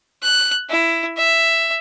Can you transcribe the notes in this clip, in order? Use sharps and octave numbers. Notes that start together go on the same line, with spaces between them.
F#6
E4
E5